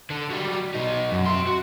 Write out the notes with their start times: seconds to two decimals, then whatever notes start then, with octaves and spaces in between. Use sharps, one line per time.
0.10 D3
0.30 F#3 G3
0.74 B2 D#4
1.12 F#2
1.26 E5 C6
1.47 F#4